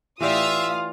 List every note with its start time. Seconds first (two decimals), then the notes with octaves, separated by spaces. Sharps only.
0.21 A2 E3 F4 G4 D5 E5 F5 D#6